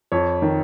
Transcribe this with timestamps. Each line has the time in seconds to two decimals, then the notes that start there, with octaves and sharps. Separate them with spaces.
0.12 F2 C#5
0.42 D#3